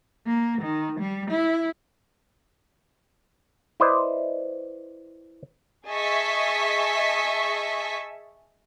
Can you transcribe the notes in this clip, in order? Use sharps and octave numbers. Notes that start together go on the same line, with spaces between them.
A#3
D#3
G3
E4
E4 B4 C5 D5 D#5
G#4 D#5 E5 A5 C#6 B6